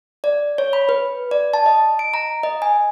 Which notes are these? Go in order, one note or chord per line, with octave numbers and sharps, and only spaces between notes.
D5
C#5
B5
B4
D5
A5
D#5
D7
A#5
D#5
G#5